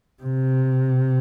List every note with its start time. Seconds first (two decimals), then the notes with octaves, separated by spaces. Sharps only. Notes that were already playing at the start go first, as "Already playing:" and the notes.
0.23 C3